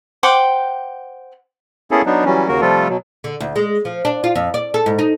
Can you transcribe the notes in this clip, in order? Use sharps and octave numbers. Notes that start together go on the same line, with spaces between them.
C5 F#5 G5 D6
A#3 B3 C#4 E4 G#4 A4
F#3 B3 D4 D#4
E3 F#3 G3 C#4
D#2 C#3 A#3 F#4 A#4
C3 F3 G3 A3 F4 A4
B2 F#3
D3
D2
G#3
F3
D4
F4
F2
D5
A4
G#2
D#4